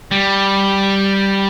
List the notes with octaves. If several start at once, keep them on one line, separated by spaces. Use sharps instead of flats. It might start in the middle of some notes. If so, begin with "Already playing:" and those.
G3